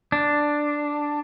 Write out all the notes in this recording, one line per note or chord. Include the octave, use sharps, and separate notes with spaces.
D4